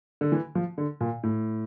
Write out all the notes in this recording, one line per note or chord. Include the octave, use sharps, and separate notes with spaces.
D3
E3
F3
D3
A#2
A2